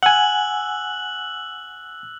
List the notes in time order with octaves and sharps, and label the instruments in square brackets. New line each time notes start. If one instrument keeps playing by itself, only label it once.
[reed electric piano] F#5 G#5 [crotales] E6 F#6 F#7